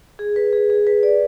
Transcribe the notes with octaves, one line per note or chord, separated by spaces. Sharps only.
G#4
B4
G#4
G#4
B4
D5